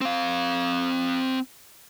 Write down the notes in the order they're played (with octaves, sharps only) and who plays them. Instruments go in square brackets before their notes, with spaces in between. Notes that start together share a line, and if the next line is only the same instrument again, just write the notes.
[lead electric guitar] C4 F5